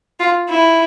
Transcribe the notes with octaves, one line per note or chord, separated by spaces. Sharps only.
F4
E4